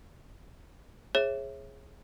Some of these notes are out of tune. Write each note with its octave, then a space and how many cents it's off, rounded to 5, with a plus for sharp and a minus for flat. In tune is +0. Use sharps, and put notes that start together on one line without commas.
G#4 +0 C#5 -35 E5 +5